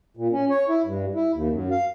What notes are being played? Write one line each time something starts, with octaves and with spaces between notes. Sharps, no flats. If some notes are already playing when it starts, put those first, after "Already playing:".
A#2
C#4
C#5
E4
G2
E4
D#2
F#2
F5